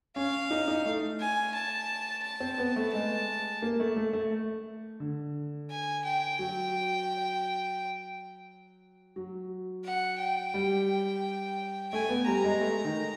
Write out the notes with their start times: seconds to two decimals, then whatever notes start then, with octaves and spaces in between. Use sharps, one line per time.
0.16 C#4 F5
0.51 D#4
0.68 D#4
0.86 A3
1.20 G#5
1.54 A5
2.24 A5
2.40 C4
2.58 B3
2.76 A3
2.93 G#3 A5
3.62 A#3
3.80 A3
3.96 A3
4.13 A3
5.00 D3
5.70 G#5
6.04 G5
6.39 F#3
9.16 F#3
9.84 F#5
10.19 G5
10.54 G3
11.92 A3 G#5
12.09 B3
12.27 G3 A#5
12.44 G#3
12.61 A3
12.85 D#3